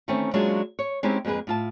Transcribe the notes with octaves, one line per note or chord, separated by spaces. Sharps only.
D#3 E3 A3 C4 C#4
F#3 G#3 A#3 C#4 D4 F4
C#5
G#3 C4 C#4 D#4 E4 G4
F2 G#3 A#3 G#4 B4
A2 F4 A5